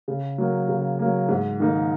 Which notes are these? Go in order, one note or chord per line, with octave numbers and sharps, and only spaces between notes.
C#3
F#3 A#3
C#3
F#3 A#3
G#2
D#3 A#3 D#4